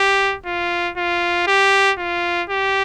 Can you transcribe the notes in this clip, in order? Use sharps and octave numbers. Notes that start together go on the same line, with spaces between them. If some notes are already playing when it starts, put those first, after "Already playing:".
Already playing: G4
F4
F4
G4
F4
G4